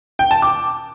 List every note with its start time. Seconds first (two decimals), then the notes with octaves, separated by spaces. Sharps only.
0.19 G5
0.31 A5
0.42 D6